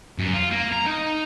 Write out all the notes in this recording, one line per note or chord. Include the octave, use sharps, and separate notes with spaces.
F#2
F4
A#3
A#5
D#4